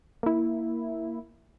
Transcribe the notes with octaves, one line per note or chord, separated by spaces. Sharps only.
A#3 E4